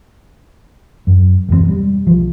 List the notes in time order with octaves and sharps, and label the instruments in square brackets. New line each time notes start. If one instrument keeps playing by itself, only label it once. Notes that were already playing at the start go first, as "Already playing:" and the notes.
[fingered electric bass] F#2
E1 F#2 F3 C4
G3
B1 F3